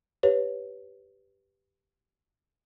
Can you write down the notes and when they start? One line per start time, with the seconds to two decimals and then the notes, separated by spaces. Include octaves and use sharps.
0.23 G4 B4 C#5